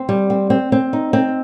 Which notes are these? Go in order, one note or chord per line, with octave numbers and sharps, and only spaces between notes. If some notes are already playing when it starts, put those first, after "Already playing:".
Already playing: C4
G3
C4
C4
C4
D#4
C4